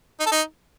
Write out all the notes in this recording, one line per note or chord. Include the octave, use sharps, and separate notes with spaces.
D#4
A4
D#4